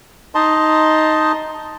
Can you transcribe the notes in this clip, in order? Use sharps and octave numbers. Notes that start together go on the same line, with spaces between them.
D#4 D#5 A5 C6